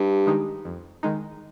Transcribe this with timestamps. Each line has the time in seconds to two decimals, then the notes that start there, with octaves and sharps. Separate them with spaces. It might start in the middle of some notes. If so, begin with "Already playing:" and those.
Already playing: G2
0.26 D#3 G#3 D#4
0.65 F2
1.03 D#3 G#3 D#4